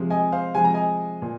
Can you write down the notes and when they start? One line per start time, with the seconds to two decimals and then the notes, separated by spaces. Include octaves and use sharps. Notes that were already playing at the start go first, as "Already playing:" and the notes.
Already playing: C3 F3 G#3
0.10 D#5 G#5
0.32 C5 F5
0.55 C3 F3 G#3 G#5
0.64 A#5
0.74 D#5 G#5
1.22 A#2